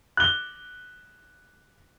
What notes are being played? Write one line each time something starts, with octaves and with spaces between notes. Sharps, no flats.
F#6 G7